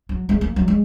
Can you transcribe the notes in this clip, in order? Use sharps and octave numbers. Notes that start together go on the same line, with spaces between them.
F#3
G#3
A#3
F#3
G#3